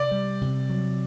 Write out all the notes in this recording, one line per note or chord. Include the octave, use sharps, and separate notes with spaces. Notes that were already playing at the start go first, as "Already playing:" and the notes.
Already playing: C3 D5
G3
C3
F#3